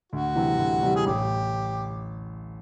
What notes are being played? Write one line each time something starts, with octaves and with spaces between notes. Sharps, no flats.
D2 F#4
C3 E3 G3
D2
C3 E3 G3
G#4
A1 G4